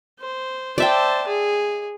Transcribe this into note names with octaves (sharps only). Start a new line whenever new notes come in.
C5
C5 D5 E5 G5 A5
G#4